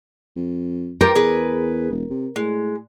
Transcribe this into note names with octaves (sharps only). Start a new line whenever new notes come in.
F2
F4 G4 A#4 G5
E2 G#4 B4
E1
C3
A2 G#3